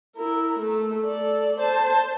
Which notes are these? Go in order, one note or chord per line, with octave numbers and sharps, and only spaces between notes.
E4 A#4
A3
A4 D5
C5 A5